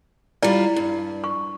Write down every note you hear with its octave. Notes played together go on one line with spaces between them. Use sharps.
G3 E4 F4 D5
G2
C#6